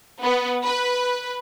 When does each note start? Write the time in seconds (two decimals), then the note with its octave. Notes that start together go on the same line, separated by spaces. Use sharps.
0.22 B3
0.63 B4